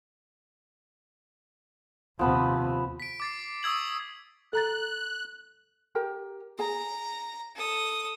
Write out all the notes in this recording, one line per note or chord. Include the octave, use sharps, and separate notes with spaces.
D#2 C3 F3 B3 B4
B6 D7
D6 A6 C7
C#6 D#6 E6 G#6 F#7
A4 A#5 F#6 A6
G4 A#4 G5
G#4 G#5 A#5
A4 D#6